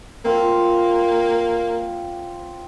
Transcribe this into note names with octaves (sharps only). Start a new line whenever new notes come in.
A#3 C4 F4